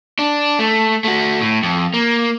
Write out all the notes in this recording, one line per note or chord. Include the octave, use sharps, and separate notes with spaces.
D4
A3
A3 F#4
A2
F2
A#3